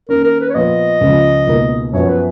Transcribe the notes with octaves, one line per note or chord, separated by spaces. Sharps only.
D#3 A#3 C#4 A#4
A#4
B4
C#5
A#2 F3 B3 F4 B4 D#5
C#2 C#3 F3
C#2 B2 A#3 D#4
F#2 F3 B3 C#5
B4